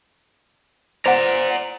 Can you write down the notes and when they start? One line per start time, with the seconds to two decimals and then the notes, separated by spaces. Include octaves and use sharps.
1.06 C5 D5 F#5 A#5